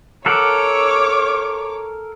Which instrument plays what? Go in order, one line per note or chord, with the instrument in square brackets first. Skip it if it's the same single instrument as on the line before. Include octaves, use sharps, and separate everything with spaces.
[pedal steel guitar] A4 A#4 F#5 [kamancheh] C#5 D6